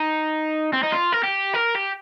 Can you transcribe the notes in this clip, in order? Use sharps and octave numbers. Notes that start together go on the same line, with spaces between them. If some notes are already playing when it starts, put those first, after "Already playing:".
Already playing: D#4
C4
D#4
F4
A#4
G4
A#4
G4